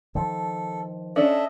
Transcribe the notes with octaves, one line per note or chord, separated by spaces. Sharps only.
D#3 F3 A4
C#4 D4 A4 D#5 E5